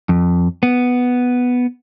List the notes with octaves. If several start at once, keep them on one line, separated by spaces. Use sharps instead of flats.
F2
B3